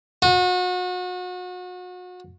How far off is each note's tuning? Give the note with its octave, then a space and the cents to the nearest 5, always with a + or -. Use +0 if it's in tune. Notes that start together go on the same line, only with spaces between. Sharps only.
F#4 -35